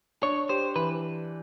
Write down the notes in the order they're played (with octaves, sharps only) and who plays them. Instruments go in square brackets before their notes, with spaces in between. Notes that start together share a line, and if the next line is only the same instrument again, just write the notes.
[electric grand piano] D4 [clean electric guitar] C#5
[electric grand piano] G4 [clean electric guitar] C5
[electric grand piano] E3 [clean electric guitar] B4